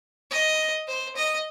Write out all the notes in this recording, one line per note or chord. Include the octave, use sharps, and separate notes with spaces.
D#5
C5
D#5